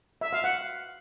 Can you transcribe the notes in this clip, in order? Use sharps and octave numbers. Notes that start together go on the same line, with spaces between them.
E5
F5
F#5